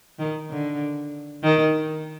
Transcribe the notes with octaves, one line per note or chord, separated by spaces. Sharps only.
D#3
D3
D#3